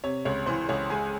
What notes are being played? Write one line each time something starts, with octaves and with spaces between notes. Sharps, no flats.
C3 C#5
C#2 C#5
E3 C5
C#2 C#5
G#3 G#5